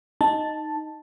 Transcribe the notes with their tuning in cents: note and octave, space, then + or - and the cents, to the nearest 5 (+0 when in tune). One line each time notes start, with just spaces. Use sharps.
D#4 -5 A5 +0